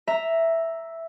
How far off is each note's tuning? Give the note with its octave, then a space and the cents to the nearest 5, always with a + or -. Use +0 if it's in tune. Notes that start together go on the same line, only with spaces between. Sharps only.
E5 +0 A#5 +0